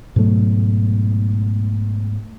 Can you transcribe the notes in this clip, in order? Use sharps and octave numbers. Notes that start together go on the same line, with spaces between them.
G#2 B2 F#3 A3